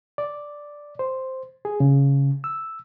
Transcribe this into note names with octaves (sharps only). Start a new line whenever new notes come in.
D5
C5
G#4
C#3
E6